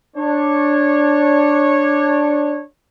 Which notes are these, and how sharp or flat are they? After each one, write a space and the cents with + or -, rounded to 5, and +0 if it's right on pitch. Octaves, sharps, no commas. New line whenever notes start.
D4 +0 C#5 -15